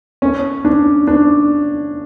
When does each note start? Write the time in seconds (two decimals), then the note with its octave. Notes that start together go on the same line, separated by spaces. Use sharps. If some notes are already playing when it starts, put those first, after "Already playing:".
0.22 C#4
0.65 D4
1.07 D4